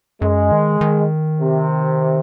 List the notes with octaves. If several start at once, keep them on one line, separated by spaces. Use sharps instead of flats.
F#2 G#3
D#3
D#3
C3